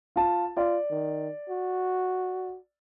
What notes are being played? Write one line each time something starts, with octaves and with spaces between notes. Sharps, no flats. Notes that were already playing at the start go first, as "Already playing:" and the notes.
F4 A5
F4 D5
D#3
F#4